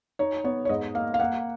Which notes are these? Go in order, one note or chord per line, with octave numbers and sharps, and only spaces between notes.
D#4 C#5
B3 C#5
C#5
G#2 D#5
A#3 F5
F5
A#3 F#5